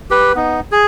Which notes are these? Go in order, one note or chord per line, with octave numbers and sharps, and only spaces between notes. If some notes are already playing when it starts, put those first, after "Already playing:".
G4 B4
B3 D#4
G#4